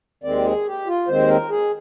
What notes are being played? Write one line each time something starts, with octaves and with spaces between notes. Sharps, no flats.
D#2 D#3 G#3 C4 D5
G#4
G4
F4
D#2 D#3 G#3 C4 C5
A#4
G#4